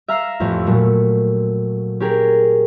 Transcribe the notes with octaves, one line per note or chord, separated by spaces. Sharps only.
E5 F5 A#5 F6 B6 C7
A1 F2 C#4
A#2 F#3 A3
C#4 G4 G#4 A#4